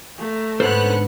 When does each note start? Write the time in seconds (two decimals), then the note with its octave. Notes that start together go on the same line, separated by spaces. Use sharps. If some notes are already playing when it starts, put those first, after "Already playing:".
0.18 A3 A#5
0.60 G#2 D3 B3 C#4 A4 C5 F#6